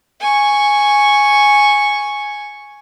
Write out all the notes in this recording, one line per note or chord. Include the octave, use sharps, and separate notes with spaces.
G#5 C#6